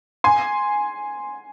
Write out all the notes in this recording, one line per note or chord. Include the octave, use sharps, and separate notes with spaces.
G#5 C6